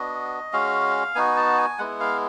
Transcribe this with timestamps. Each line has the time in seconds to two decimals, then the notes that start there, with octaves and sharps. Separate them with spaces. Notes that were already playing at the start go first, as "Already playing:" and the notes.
Already playing: B3 D4 F#4 D#5
0.53 G#3 C#4 F#4 F5
1.15 B3 D#4 F#4 G#5
1.37 A5
1.58 G#5
1.78 G#3 B3 E4 F#5
2.00 F5